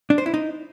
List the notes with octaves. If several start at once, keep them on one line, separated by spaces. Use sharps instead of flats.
D4
C5
E4
D#4